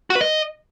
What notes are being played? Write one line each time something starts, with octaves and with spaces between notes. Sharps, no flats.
F#4
B4
D#5